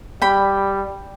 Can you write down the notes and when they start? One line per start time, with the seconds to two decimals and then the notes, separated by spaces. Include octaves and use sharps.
0.22 G3 G5 B5